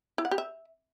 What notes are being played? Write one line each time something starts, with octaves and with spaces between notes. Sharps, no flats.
E4
F#5
G4
E5